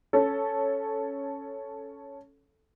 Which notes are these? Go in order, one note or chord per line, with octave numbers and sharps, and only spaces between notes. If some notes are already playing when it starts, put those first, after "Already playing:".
C#4 A4